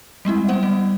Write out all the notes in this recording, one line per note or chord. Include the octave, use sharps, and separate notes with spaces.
G3 G#3 C4 E4
B3 C5 F#5
G3